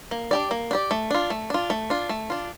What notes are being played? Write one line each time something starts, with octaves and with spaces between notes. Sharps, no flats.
A#3
D4 G4 D5
A#3
D4 G4 D5
A3
D4 F4
A3
D4 F4
A3
D4 F4
A3
D4 F4